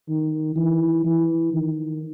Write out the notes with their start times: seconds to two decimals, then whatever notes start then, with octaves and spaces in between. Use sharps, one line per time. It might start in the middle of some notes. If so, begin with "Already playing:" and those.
0.09 D#3
0.56 E3
1.05 E3
1.53 D#3